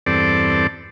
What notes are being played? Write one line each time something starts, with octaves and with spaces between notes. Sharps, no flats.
E2 G2 C4 A4 D5